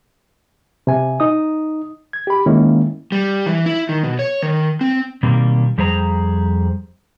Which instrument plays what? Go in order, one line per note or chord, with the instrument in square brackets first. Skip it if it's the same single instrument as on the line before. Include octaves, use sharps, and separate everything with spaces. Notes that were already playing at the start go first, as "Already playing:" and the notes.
[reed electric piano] C3 G#5
D#4 D#6
G#6
G4 B5
D#3 G#3 A#3 C#4 E4
[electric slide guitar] G3
E3
E4
D#3
B2
C#5
D#3
C4
B2 D#3 G3 A#3 C4
F2 G3 G#4 C5 A#5